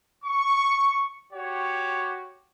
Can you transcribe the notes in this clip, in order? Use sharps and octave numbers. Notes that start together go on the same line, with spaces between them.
C#6
F#4 G4 C#5